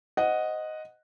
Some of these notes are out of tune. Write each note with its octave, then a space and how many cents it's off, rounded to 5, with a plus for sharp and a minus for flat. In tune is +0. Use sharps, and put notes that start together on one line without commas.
C5 -10 D#5 +0 F#5 +0